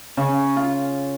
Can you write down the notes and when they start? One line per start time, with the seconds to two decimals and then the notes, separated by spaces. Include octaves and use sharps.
0.17 C#3
0.56 F4